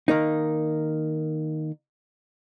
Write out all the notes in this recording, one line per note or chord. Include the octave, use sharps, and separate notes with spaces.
D#3 A#3 D#4